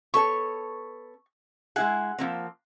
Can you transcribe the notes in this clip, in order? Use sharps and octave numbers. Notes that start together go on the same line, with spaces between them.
B3 A4 C#5 C#6
G#3 E4 G#4 F#5
F3 A#3 C4